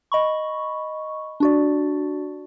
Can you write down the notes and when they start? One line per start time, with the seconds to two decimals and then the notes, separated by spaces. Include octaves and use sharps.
0.12 D#5 B5 C#6
1.40 D4 F#4 D5